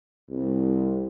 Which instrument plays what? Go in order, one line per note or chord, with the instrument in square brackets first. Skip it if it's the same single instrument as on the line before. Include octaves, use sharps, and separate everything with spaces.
[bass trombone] C2